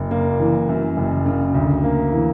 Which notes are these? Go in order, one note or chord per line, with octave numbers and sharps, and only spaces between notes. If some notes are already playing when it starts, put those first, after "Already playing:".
Already playing: F#1
A#3
E3
F#2
F#1
C#3
D2
A#3
E3